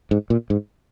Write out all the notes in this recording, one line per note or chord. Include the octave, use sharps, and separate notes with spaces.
G#2
A#2
G#2